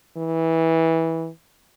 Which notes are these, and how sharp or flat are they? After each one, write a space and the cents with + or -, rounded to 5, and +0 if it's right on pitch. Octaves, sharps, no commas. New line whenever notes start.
E3 -15